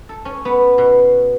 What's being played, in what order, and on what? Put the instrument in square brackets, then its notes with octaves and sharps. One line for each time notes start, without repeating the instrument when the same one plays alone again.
[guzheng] A4
C#4
B3
B2